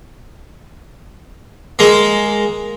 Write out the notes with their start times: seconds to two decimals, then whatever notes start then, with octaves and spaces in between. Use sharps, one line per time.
1.79 G#3 A#3